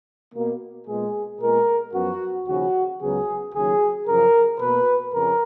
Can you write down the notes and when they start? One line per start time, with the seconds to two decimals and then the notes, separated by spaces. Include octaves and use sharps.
0.34 B2 A#3
0.87 A#2 G#3 B3 G#4
1.40 A#2 G#3 B3 A#4
1.94 F#2 F3 B3 F#4
2.47 D#2 C#3 F3 F#4
3.00 C#2 C#3 F#3 B3 G#4
3.54 D#2 C#3 F#3 G#4
4.07 F#2 C#3 F3 A#4
4.60 B2 A#3 B4
5.13 F2 C#3 A#4